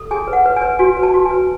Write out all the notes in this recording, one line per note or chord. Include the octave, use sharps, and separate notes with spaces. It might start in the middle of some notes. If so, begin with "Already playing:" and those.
Already playing: A4
G#4 G#5
B4
F#5
B4
G#5
B4
F#4 G#5
B4
A5
F#4
G#5
B4